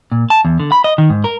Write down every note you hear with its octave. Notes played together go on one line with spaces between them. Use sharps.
A#2
A5
E2
D3
B5
D#5
D#3
G#2
A#4